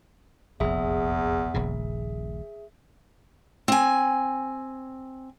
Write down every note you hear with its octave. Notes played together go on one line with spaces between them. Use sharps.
F1 A#1 E2 G#4 E5
D#1 A#1 C#3
C4 G#5